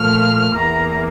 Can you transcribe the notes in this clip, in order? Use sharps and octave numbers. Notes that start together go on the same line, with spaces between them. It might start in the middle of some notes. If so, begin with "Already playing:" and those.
Already playing: A#2 F3 A3 F6
E2 E3 A#3 A#5